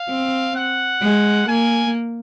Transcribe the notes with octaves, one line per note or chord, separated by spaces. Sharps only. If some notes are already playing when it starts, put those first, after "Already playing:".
Already playing: F5
C4
F#5
G#3
A#3 G#5